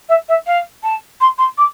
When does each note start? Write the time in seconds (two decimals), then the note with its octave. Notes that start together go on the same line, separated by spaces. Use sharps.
0.09 E5
0.28 E5
0.46 F5
0.83 A5
1.21 C6
1.38 C6
1.57 D6